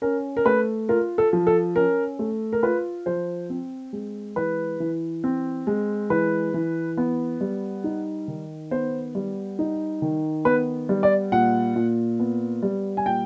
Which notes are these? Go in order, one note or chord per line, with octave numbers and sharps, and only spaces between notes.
C#4 A#4
A#4
A3 B4
F4 A#4
A4
F3
A4
C#4 A#4
A3
A#4
F4 B4
F3 C5
C4
G#3
E3 B4
E3
C4
G#3
E3 B4
E3
B3
G3
D#4
D#3
B3 C5
G3
D#4
D#3
B3 B4
G3
D5
A#2 F#5
A#2
B3
G3
G#5
A#2 G5